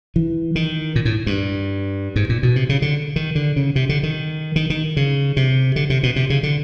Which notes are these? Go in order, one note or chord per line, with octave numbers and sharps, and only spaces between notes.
E3
D#3
A#2
A2
G2
G#2
A#2
B2
C3
C#3
D3
D#3
D3
C#3
C3
D3
D#3
D#3
D#3
C#3
C3
D3
C3
B2
C3
C#3
D3